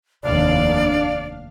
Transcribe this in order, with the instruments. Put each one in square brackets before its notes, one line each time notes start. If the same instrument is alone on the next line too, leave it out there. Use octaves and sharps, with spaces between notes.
[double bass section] F1 D#2 [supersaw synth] D4 F5 F6 [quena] D5